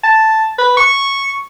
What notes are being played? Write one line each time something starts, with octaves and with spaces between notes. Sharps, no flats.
A5
B4
C#6